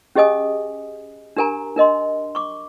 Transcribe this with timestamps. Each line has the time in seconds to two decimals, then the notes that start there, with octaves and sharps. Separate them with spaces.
0.16 C#4 G4 G#4 D#5 G#5 D#6
1.37 D4 G4 A#4 G#5 A#5
1.76 D4 A#4 D#5 C6
2.35 C#6 D6